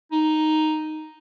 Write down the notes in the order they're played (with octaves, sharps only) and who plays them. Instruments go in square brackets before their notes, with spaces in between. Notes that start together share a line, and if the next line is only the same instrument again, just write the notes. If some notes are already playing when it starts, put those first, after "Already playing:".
[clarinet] D#4